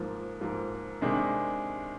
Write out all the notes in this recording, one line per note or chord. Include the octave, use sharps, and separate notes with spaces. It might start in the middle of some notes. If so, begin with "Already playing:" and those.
Already playing: G#2 F3 A#3
G#2 F3 A#3
C3 D#3 G#3 D4